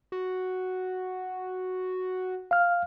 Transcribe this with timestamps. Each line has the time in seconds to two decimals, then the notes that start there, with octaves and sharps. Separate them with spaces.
0.12 F#4
2.51 F5 F6